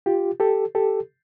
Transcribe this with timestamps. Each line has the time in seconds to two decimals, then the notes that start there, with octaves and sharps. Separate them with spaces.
0.06 F4 G4
0.40 G4 A4
0.75 G4 A4